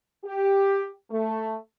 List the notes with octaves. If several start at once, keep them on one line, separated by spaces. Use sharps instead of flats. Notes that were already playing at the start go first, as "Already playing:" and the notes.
G4
A3